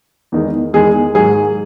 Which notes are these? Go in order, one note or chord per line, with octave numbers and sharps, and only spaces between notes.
E2 D#3 G#3
E2 D#3 G#3 G#4
G#2 D#3 F#3 G#4